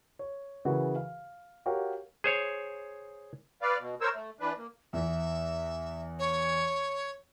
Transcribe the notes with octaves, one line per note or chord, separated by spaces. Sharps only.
C#5
C#3 E3 F#4 G#4 A#4
F5
F#4 G4 A#4 C#5 F5
G#4 C5 C#5
B4 D5 F5
B2
A#4 C5 C#5 E6
A3
E3 D4 B4
A#3
E2 E3 E5
C#5